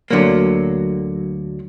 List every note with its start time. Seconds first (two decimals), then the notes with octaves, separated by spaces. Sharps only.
0.11 D2 D3 F#3 A#3